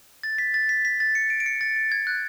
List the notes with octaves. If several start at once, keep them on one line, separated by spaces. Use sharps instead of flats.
A6
B6
A6
B6
B6
A6
C#7
D7
D7
C#7
A6
A6
G#6
F#6